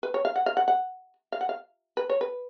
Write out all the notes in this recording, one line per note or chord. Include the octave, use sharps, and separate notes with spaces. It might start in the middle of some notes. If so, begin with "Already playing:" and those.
B4
C#5
F5
F#5
F5
F#5
F#5
F5
F#5
F5
B4
C#5
B4